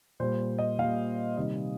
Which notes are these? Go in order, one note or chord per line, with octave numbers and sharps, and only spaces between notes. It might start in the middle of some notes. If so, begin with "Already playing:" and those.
A#2 G3 C5
D#5
A#2 G3 F5
C3 D#3 G3 D#5